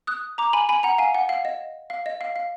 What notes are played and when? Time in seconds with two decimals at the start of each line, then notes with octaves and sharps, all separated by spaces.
0.07 D#6 F#6
0.38 A#5 D6
0.53 G#5 B5
0.69 G#5 B5
0.83 F#5 A#5
0.98 F5 G#5
1.15 F#5
1.29 F5
1.45 D#5
1.90 F5
2.06 D#5
2.21 F5
2.36 F5